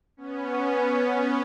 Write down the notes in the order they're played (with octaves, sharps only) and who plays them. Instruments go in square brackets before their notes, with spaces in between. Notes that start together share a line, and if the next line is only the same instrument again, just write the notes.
[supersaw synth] B3 C#4